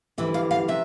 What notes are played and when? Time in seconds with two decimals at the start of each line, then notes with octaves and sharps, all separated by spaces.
0.18 D2 C3 E3 G3 E5
0.34 F5
0.51 F5
0.68 C3 E5